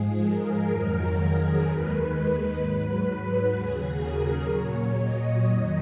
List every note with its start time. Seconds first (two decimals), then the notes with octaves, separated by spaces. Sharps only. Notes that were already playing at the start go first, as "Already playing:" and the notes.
Already playing: G#2 F3 G#3 G#4
0.19 A#4
0.66 F2 D#3 F#3
1.13 G#4
1.61 D#2 D#3 G#3 B4
2.56 G#2 F#3 B4
3.52 D#2 C#3 F#3 G#4
3.99 A#4
4.47 A#2 F#3 C#5
4.95 D#5
5.43 F2 D#3 F#3